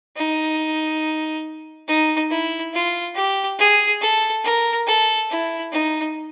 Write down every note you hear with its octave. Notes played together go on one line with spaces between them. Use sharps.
D#4
D#4
E4
F4
G4
G#4
A4
A#4
A4
E4
D#4